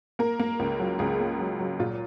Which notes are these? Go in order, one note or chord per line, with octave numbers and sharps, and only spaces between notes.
A#3 A#4
A#3
C#2
F#3
C#2 G#4
A#3
F#3
F#3
A#2 F4